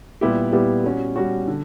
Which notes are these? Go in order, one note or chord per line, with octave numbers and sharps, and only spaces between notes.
A#2 G3 B3 E4 G4
A#2 G3 B3 E4 G4
G3 C#4 F#4
G3 C#4 F#4
D3